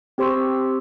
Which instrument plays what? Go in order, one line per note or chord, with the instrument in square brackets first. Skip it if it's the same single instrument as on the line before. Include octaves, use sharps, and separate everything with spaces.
[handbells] C4 G4 C5 C6 C#6 E6